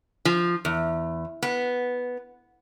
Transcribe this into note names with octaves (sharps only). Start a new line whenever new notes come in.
F3
E2
B3